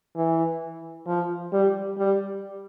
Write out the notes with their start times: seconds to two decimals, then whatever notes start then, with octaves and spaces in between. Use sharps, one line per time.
0.16 E3
1.07 F3
1.53 G3
1.98 G3